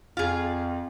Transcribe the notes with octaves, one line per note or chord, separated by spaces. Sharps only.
F2 F4 G#4